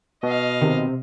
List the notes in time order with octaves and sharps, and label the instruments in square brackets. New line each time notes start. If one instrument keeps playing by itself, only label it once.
[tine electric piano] B2 [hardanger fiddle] D#5 F5
[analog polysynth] C3 [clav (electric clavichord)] D#3